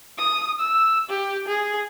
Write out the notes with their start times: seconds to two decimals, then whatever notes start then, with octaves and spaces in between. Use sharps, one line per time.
0.18 D#6
0.60 E6
1.09 G4
1.47 G#4